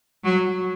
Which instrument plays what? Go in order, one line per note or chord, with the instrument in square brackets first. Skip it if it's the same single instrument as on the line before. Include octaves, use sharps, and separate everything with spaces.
[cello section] F#3